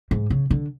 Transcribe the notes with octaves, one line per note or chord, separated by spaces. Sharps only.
G#2
C#3
D3